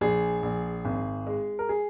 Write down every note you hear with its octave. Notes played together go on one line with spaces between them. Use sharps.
A#1 G#4
A#1
G#1
G#3
A#4
G#4